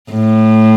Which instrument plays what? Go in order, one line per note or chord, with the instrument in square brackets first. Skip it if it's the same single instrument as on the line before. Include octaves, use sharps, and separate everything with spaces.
[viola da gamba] A2